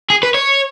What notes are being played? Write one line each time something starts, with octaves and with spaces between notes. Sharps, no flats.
G#4
B4
C#5